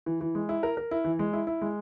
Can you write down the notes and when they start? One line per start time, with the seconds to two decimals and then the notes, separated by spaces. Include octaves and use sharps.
0.06 E3
0.21 E3
0.35 G#3
0.49 E4
0.63 A#4
0.77 A#4
0.91 E4
1.05 E3
1.19 G#3
1.33 E4
1.47 E4
1.62 G#3